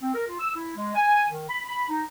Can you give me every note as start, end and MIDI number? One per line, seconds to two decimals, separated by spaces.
0.02 0.11 60
0.15 0.26 70
0.27 0.37 65
0.39 0.51 88
0.56 0.73 64
0.76 0.93 56
0.95 1.25 80
1.30 1.46 51
1.49 1.62 83
1.68 1.83 83
1.89 2.03 63